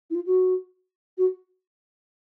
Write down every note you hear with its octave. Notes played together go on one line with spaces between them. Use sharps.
E4
F4
F#4
F#4